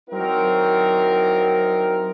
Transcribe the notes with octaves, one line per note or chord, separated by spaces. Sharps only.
F#3 C4 D#4 E4 A#4